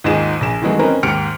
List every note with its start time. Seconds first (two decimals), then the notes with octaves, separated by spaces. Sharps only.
0.04 D#2 G#2 D#4 F4 G#4 E7
0.41 A#1 G#5 E7
0.62 D#3 E3 F#3 G#3 A3
0.79 C4 C#4 D#4 A#4 B4
1.03 D#2 G#2 G4 F6 C#7 D7